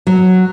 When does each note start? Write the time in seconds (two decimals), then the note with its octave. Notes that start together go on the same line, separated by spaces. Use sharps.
0.07 F#3